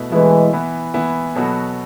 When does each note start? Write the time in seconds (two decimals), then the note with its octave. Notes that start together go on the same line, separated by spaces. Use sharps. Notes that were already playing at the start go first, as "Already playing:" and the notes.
Already playing: B2 A3 E4 B4
0.11 B2 E3 G#3 A3 E4 B4
0.53 E3 B3 E4
0.94 E3 B3 E4
1.36 B2 F#3 B3 F#4 A4